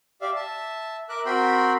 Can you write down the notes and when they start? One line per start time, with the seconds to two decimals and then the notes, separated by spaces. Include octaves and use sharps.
0.21 G4 D5 E5 F5
0.36 E5 A5
1.09 A#4 E5 D6 F#6
1.26 C4 F#4 A#4 G5 B5 C6